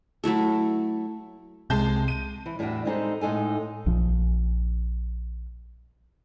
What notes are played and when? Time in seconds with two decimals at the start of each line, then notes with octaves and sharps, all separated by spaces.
0.24 F#3 A3 E4 A4
1.70 C2 C3 G#3 A5 G6
2.08 D#7
2.46 E3
2.59 E2 A2 G3 D4 F#4 E5
2.85 G3 G#3 C4 D#4 G#4 A4
3.21 A2 G#3 D#4 A4 G#5
3.86 A#1 F3